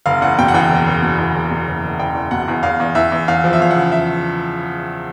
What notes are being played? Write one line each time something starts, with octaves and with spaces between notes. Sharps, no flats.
F#1 F5
E2 F#5
B2 G5
F#5
E2 G5
F#1
F#1
B2
E2
F#1
B2
F#1
F#1
F#1 G5
E2
B2 F#5
E2
E2 F5
E2
E2 E5
E2
E2 F5
F3
E5
E2 F5
F#5
C#3
E5